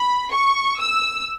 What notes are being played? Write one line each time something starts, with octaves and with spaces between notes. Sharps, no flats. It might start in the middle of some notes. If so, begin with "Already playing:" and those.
Already playing: B5
C#6
E6